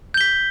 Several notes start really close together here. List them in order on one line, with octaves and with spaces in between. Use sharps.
G6 G7 B6